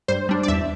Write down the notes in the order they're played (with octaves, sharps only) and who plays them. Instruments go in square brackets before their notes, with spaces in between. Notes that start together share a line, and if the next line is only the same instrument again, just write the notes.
[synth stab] G2 C5
G3 D4
D5
E2 E5